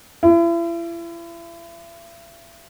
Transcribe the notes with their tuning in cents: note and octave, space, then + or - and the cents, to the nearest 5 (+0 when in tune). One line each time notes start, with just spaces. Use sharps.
E4 +40